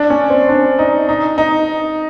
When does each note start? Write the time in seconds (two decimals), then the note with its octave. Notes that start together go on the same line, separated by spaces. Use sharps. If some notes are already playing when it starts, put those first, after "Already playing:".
Already playing: D4
0.10 C#4
0.30 C4
0.49 D4
0.79 D#4
1.09 D#4
1.38 D#4